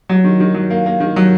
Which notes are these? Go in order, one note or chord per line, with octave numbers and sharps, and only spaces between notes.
F#3
D#3
D#3
F#3
A#3
A#3
D#3
F#3